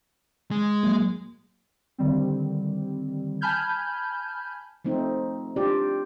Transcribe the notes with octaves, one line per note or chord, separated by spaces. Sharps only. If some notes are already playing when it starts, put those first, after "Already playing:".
G#3
F#3 A#3
D3 D#3 G3 C4
G#5 A5 B5 F6 G6 G#6
F3 A3 C4 D#4
D4 F4 G4 D5